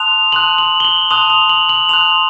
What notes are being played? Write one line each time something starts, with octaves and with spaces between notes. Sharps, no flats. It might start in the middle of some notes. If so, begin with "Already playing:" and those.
Already playing: A5 C6 D#6 F#6 F7
A5 C6 D#6 F#6 F#7
F#7
G7
F#7
A5 C6 D#6 F#6 F7
F7
F#7
F#7
A5 C6 D#6 F#6 F7